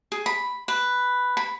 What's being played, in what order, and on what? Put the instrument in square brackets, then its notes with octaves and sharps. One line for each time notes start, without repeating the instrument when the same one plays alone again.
[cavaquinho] G#4
B5
B4
B5